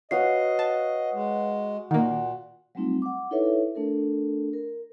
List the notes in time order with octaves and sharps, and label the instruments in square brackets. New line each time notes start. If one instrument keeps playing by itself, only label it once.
[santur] F#4 F5 [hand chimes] B4 C#5 C7 [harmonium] D#5
[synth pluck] A5
[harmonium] G#3
[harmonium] A#2 [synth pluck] D#3 A#3 [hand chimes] F#5
[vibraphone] F#3 G3 A3 C4 D#4 F4
F#5 D6
D#4 E4 A4 B4 C#5 E5
A3 D4 A4 A#4
A#4